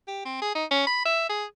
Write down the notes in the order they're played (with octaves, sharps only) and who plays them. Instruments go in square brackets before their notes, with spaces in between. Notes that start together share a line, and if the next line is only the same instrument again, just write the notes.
[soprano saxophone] G4
C4
G#4
D#4
C#4
B5
E5
G#4